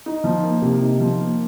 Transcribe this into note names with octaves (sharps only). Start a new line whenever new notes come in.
D#4
F3
A#3
C3
D#4
F3
A#3